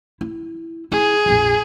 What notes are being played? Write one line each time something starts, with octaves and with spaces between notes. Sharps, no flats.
E4
E4 G#4
A#1 F2